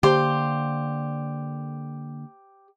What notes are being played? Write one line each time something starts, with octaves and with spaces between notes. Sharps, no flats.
D3 A#3 G4 C5